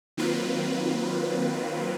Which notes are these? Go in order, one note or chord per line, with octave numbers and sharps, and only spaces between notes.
D#3 F#3 A#3 C4 F4 B4